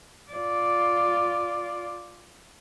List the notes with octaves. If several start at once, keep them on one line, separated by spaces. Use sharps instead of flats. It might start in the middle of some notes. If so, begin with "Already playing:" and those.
F4 D5